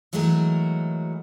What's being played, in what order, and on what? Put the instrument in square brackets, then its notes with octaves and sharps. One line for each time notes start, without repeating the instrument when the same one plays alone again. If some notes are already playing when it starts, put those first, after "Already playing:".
[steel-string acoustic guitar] E3 F#3 G#3 A3 F#4 A#4